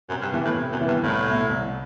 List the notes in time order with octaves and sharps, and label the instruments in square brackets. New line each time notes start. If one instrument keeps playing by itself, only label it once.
[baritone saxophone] F#2 [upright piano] C3
[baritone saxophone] G2
[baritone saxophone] G2 [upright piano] E3 B3 E4
[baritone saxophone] A2
[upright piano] C3
[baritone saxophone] F#2
[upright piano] E3 B3 E4
[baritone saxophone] G2
[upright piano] C2 [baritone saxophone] A2
[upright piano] B2 A3
C2